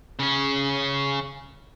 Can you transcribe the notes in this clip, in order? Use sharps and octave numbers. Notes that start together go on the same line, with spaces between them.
C#3 C#4